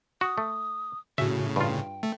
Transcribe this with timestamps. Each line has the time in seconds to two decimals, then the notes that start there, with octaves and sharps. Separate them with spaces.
0.21 F#4 D#6
0.38 A3
1.18 A2 C#3 F#4 E5
1.56 G2 F4 G5
2.03 A3